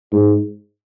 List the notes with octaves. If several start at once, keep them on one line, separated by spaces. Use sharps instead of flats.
G#2